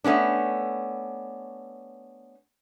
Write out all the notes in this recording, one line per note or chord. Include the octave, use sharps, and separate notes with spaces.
A3 B3 C#4 D4